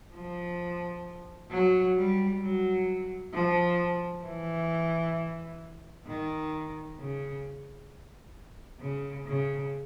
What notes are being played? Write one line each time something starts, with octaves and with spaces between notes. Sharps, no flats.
F3
F#3
G3
F#3
F3
E3
D#3
C#3
C#3
C#3